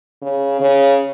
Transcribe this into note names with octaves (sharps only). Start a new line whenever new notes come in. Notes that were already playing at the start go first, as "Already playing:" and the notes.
C#3
C#3